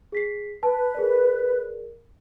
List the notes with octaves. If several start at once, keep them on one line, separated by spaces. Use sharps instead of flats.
G#4 B6 C7
B4 A5
G#4 A#4 D5